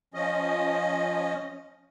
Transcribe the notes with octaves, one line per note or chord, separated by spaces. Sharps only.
F3 C#4 D#5